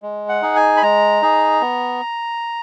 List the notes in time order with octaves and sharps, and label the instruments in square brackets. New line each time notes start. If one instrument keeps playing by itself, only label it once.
[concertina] G#3
F#5
D#4 G#4
G#5
B5
G#3 A#5
D#4 G#4
B3